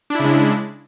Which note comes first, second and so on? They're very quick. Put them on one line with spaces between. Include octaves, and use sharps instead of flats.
D4 E4 C#3 G#3